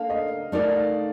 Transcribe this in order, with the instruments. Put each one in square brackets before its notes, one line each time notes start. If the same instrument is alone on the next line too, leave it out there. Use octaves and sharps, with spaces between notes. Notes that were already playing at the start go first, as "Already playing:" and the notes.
Already playing: [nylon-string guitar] A#3 D4 A4 [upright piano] F5
[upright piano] D#5
[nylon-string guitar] A3 D#4 A#4 [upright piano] D5